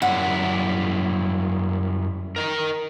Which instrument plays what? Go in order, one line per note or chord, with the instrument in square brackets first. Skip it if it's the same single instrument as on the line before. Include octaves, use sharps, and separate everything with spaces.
[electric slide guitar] F#2 G3 E4 [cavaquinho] F#5
[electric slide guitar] A#4 D#5